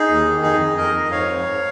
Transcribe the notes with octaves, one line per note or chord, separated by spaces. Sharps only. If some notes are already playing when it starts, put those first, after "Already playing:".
Already playing: D#4 G#4
D#2
D#3
F2 D#4 G#4
F2
F2 A#4 D#5
F2
G#2 C#5 F5
G#2
G#2